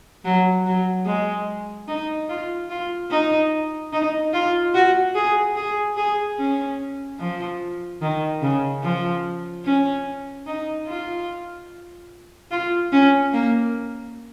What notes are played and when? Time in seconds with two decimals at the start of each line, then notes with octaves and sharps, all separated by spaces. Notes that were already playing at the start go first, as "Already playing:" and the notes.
0.24 F#3
0.66 F#3
1.06 G#3
1.88 D#4
2.29 F4
2.70 F4
3.10 D#4
3.92 D#4
4.33 F4
4.74 F#4
5.15 G#4
5.56 G#4
5.97 G#4
6.38 C#4
7.19 F3
8.02 D#3
8.42 C#3
8.83 F3
9.65 C#4
10.47 D#4
10.87 F4
12.51 F4
12.92 C#4
13.33 A#3